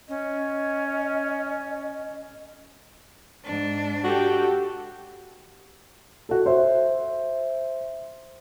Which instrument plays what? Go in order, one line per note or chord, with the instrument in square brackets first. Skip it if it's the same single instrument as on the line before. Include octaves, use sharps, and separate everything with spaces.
[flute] C#4 [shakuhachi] D#5
[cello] G#2 D4
[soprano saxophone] F#4 [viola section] G4 A4 G5
[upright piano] F#4 A4
C5 E5